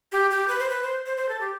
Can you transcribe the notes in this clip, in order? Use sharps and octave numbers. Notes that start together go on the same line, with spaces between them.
G4
G4
B4
C5
B4
C5
C5
C5
A4
G4